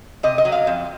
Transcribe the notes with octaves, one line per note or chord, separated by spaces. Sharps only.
C3 D#5
D#5
F#3
F5
F2